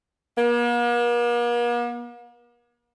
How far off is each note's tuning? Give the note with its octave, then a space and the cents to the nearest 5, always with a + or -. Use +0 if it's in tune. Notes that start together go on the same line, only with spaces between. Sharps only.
A#3 +45